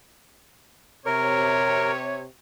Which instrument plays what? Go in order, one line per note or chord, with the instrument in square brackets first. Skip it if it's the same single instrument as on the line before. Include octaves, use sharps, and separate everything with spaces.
[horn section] C3 C#5 [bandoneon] A#4